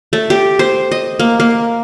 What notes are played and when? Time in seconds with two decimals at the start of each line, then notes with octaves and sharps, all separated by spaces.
0.13 A3
0.30 G4
0.59 C5
0.91 D#5
1.20 A#3
1.40 A#3